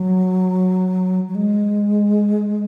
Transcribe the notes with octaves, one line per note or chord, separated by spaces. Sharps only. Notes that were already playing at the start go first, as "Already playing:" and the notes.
Already playing: F#3
F#3
G#3